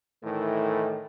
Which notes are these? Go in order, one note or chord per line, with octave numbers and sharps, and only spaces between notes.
A2 D#3 E3 A3